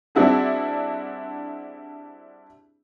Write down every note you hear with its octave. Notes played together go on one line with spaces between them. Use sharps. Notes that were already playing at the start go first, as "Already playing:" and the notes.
G3 C4 D4 E4 F#4 G#4